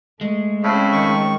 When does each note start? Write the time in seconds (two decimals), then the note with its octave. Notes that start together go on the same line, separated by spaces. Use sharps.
0.21 G#3 A3
0.62 A2 C#3 C4 C#4
0.92 D#3 C#6